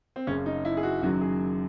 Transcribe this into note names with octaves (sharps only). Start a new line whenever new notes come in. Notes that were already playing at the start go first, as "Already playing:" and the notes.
C4
F#1 F#2 C#3 C#4
D#4
E4
G#4
F#4
F#1 F#2 D#3 F#3 F#4
G#4